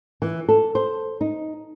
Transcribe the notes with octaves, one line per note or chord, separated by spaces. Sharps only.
E3
A4
C5
D#4